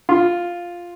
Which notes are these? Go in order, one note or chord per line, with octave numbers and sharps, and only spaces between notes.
F4